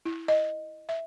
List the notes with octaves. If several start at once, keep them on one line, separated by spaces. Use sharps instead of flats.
E4
D#5
E5